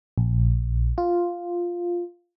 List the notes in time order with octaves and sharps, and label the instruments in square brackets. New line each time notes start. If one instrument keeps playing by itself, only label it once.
[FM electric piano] A#1
F4